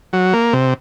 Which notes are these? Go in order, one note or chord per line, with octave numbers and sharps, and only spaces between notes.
F#3
A#3
C3